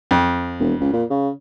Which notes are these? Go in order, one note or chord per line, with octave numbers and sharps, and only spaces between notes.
F2
E1
C#2
A#2
C#3